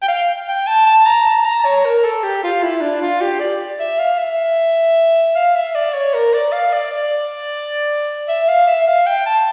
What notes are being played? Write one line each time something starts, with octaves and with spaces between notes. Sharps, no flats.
G5
F5
G5
A5
A5
A#5
A5
A#5
C#5
A#4
A4
G4
F4
E4
D4
F4
G4
D5
E5
F5
E5
F5
E5
D5
C#5
A#4
D5
F5
D5
D5
E5
F5
E5
F5
G5
A5